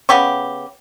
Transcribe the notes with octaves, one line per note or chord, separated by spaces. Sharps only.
C#3 B3 G4 C#6